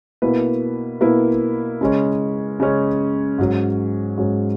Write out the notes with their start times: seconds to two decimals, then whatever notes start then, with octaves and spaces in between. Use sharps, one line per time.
0.22 B2 A#3 E4 B4
1.01 B2 A#3 E4 B4
1.81 C#3 G#3 C#4
2.60 C#3 G#3 C#4
3.38 G#2 F#3 C#4
4.18 G#2 F#3 C#4